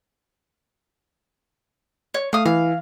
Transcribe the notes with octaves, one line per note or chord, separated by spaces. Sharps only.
C#5
A3 F5 D#6
E3 F5